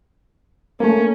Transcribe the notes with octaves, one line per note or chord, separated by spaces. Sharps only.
A3 A#3 C#4